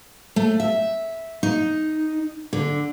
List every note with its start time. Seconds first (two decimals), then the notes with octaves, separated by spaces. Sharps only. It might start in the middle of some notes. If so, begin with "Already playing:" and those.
0.36 A3
0.60 E5
1.43 D#4
2.53 D3